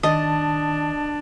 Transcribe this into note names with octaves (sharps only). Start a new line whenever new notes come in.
D#3 D4 D#5 A5